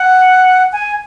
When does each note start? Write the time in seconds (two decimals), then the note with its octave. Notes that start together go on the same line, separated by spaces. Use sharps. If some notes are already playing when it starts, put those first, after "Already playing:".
Already playing: F#5
0.72 G#5